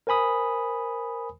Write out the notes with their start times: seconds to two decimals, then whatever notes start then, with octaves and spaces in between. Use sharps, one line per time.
0.07 A#4 C5 G#5 B5 D#6